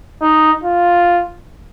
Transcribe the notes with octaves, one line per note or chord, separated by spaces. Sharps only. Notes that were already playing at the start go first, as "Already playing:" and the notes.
D#4
F4